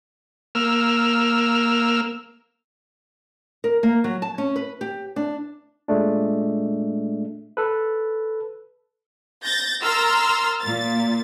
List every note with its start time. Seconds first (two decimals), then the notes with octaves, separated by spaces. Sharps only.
0.55 A#3 E6 F6
3.64 A#4
3.83 A#3
4.04 F#3
4.22 A5
4.38 C#4
4.56 B4
4.81 G4
5.16 D4
5.88 A#2 G#3 A3 D4
7.57 A4 B4
9.44 G6 A6 A#6
9.83 A#4 A#5 C6 E6 F6 A6
10.61 A#2 A6